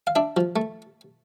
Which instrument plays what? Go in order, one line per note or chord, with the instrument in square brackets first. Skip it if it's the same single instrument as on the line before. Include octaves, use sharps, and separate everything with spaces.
[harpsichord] F5
D4 E5
F3
A3